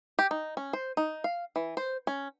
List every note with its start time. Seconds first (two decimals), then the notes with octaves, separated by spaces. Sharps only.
0.19 G4
0.31 D#4
0.57 C#4
0.73 C5
0.97 D#4
1.24 F5
1.56 E3
1.77 C5
2.07 C#4